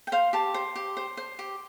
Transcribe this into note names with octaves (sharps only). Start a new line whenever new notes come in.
G5
C5 F5
G4 A5
C5
G4
C5
C5
G4